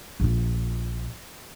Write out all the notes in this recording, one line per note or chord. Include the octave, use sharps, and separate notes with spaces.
A#1 F4